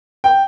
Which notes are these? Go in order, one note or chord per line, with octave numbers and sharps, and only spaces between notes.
G5